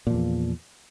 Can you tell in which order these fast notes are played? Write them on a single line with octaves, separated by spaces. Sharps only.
A#2 F3 E2